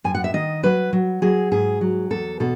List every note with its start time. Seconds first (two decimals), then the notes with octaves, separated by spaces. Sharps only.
0.04 F#2 G#5
0.15 F#5
0.24 E5
0.34 D#3 D#5
0.63 F#3 B4
0.93 F#3
1.22 F#3 G#4
1.51 G#2 G#4
1.81 F#3
2.10 E2 A4
2.40 B2 A4